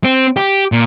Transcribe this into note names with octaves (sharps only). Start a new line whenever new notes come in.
C4
G4
A#2